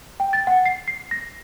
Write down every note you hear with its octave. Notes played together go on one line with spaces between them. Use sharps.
G5
A6
F#5
C7
C7
A#6